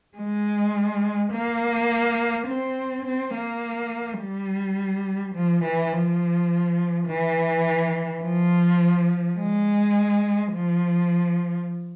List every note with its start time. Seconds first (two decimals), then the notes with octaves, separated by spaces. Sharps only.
0.17 G#3
1.32 A#3
2.47 C4
3.05 C4
3.34 A#3
4.20 G3
5.35 F3
5.64 E3
5.93 F3
7.07 E3
8.23 F3
9.39 G#3
10.53 F3